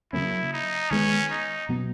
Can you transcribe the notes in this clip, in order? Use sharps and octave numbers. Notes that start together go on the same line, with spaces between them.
C#3 F#3 A#3 C#4 E4
D#4
D#3 G#3 B3 C#4
D#4
B2 F#3 B3